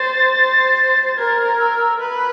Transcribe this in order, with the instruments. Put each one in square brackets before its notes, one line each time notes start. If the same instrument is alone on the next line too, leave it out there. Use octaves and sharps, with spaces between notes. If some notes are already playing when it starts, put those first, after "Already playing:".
Already playing: [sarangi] C5 [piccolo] A6
[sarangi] C5
[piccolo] A6
[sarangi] A#4 [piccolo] G#6
[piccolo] E6
F6
E6
[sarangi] B4 [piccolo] F6